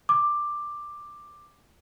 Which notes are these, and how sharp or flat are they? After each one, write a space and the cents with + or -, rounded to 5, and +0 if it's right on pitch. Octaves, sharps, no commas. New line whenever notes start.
D6 +10